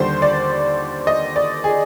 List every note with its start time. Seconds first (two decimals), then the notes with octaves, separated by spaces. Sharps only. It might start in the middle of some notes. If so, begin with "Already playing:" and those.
Already playing: D#2 D3 G3 C5
0.22 D5
1.07 D#5
1.36 D5
1.64 G#4